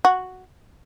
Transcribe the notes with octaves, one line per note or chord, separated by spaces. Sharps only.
F#4